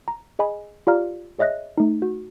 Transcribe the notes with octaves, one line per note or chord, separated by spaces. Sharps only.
A#5
G#4 D#5 G#5 B5
F4 G4 D5 F5 A#5 F6
G#4 C#5 D#5 E5 F#6 A#6
A3 D#4
F#4